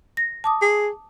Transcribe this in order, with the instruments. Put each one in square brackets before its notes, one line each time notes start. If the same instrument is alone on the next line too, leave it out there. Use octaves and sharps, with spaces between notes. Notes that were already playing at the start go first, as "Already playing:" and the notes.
[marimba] A#6
A5 D6 D#6
[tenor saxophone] G#4